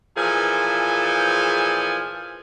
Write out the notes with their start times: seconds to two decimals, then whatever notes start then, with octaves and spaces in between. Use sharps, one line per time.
0.17 A#2 E3 F3 G#4 A4 G#5